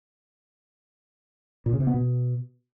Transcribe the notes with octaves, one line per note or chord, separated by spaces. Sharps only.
A#2
C#3
C3
B3
B2